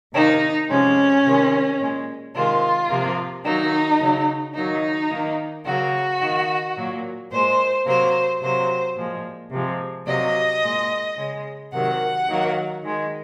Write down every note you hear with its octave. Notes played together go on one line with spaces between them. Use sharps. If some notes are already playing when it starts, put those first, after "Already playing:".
C3 D#3 A#3 D#4
C3 F3 G#3 C#4
C3 D#3 G#3
A#2 G#3
C3 D#3 G#3 F4
C3 F3 A#3
D#3 F#3 A#3 D#4
C#3 F#3 A#3
D#3 F#3 A#3 D#4
D#3 A#3
C#3 F#3 A#3 F#4
D#3 A#3
A#2 F#3 A#3
A#2 G#3 C5
C3 F#3 A#3 C5
C3 F#3 A#3 C5
A#2 F3 G#3
C3 F3 G#3
C3 F#3 A#3 D#5
A#2 G#3
C#3 G#3
C3 D#3 F#3 F#5
D#3 F#3 A#3
D#3 G#3